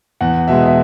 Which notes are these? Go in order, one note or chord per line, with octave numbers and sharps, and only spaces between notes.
E2 F#5
B2 G#3 E5
E5